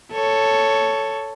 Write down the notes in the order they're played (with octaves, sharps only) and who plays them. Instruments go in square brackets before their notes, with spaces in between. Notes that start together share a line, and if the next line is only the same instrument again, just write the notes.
[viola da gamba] A4 C#5